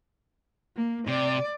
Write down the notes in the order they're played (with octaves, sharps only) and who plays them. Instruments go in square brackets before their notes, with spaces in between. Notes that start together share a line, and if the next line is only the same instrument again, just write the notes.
[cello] A#3
[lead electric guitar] C3 [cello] D5